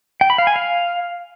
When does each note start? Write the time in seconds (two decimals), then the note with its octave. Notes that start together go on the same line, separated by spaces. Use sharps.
0.21 G5
0.30 B5
0.38 F5
0.47 G#5
0.56 F5